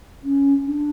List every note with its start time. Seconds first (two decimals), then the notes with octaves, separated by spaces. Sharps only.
0.24 C#4
0.66 D4